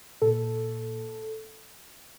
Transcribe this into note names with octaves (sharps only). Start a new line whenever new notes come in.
A#2 A4